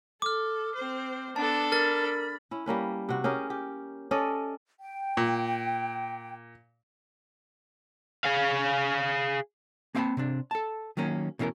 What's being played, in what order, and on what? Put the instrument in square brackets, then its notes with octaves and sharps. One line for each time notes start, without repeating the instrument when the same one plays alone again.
[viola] A4 [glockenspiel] D6 F6
[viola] C4 C5
[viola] B3 [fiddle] D4 A4 [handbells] A5
[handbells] A#4 [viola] B5 [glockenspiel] F6 A6
[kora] C#4 E4
G3 A#3 C#4 B4
C3 F#4
C#4 G4 G#4 A#4
G4
C#4 A4 D5 D#5
[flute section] G5
[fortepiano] A#2
[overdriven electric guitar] G#4 F5
[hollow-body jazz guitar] A#3 C4 F5 G5 A5 B5
C3 C4 D4
A4 A5
D#3 F#3 A#3 C#4
B2 E3 C#4 G#4 A#4